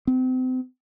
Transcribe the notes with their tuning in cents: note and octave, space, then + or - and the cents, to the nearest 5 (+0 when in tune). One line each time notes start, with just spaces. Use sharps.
C4 -35